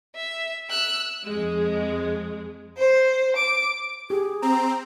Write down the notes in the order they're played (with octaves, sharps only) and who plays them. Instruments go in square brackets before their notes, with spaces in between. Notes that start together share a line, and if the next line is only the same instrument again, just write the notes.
[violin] E5
E6 F#6
[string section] F2 G#3
[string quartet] C5
D6
[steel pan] G4 [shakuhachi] G#4
[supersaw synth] C4 [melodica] A#5